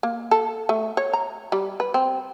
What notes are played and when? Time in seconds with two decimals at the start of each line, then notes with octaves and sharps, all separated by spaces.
0.03 A#3
0.31 A4
0.69 A3
0.97 C#5
1.13 A#5
1.52 G3
1.80 B4
1.94 C4